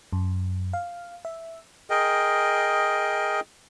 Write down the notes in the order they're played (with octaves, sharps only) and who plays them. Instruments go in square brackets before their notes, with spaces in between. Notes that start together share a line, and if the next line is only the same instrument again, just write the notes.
[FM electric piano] F#2
F5
E5
[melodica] G#4 A#4 D#5 G5